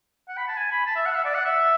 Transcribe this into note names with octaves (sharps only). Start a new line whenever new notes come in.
F#5
B5
A5
G#5
B5
A5
E5
F#5
E5
D5
F#5
E5